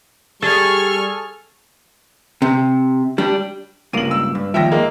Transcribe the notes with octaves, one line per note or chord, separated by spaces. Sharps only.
G3 G#4 A4 C#6 F6
C3
G3 D4
C#2 G2 A#3 D#7 F#7
E6
G2
D#2 F3 E5 G5 A#6
G#3 A#3